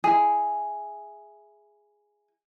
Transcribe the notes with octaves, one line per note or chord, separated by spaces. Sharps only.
E4 G#4